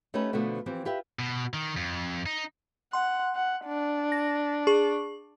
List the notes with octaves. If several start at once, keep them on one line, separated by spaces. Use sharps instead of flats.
A3 C#4 D#4 G4 A4 B4
B2 D3 F3 A3 B3
E3 F3 C4 G4
F4 G4 B4 E5
B2
D#3
F2
D#4
F#5 C6
F#5
D4
A#6
G#4 C#6